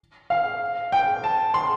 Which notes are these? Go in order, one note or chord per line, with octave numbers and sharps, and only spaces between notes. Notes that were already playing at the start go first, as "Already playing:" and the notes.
F5
G5
A5
C6